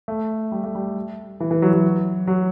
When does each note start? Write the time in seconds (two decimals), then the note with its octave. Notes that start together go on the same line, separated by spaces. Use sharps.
0.08 A3
0.52 G3
0.64 A3
0.75 G3
1.40 E3
1.51 E3
1.62 F#3
1.73 F#3
2.27 F#3